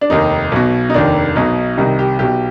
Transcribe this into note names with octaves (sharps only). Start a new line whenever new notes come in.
D4
F1 D#2 D#3 D#4
B1 B2
D#4
F1 D#2 D#3 D4
B1 B2 D#4
C2 C3 D#3 D#4
G4
B1 B2 G4